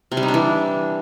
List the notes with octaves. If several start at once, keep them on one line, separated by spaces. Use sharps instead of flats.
C3
G3
D#4
D4
E3